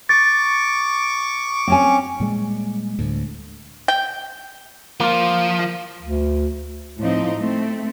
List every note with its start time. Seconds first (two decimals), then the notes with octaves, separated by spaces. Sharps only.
0.09 C#6 D6 A6
1.67 C4 C#4 G#5
2.20 A#2 G3 G#3
2.99 D2 A2
3.88 G5
5.00 F3 A#3 F4
6.03 D2
6.98 A2 F3 C4 D#4
7.38 A3 C4